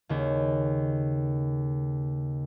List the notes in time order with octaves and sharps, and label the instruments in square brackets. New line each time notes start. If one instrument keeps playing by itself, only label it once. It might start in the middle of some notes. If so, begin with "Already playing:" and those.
[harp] D#2 C#3